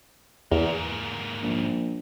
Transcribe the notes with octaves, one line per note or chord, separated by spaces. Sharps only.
E2 G#2 A#3
A#1